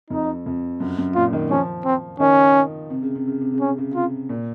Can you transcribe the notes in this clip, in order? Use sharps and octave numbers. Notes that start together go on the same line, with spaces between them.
F2 D#4
F2
F#2
F#2
A#2 F4
D#3
F3 C#4
C4
D#3 C#4
C3
C#3
C3
C#3
C3
C#3
C#4
C3
C#3
C3 F4
A#2